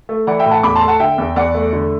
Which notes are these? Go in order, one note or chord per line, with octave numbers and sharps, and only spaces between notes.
A3
E3 D5 F#5
E5 G5
A2
F#5 A5
E2 B5 D6
A5 C6
A3
F#5 A5
D3 E5 G5
E2
E2 D5 F#5
A3
D3